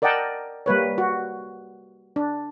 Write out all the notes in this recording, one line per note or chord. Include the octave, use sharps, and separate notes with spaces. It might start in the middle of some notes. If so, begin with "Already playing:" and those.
A#4 D5 D#5 F#5 G5 A5
G3 A#3 B4 C#5
F#4
D4